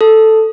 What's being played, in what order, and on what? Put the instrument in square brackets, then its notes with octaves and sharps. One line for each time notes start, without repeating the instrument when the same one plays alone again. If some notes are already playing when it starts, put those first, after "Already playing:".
[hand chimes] A4